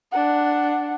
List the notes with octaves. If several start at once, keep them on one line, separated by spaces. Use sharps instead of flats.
D4 F#5